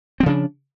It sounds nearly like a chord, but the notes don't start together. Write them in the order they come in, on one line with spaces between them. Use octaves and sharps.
C4 F3 C#3 D4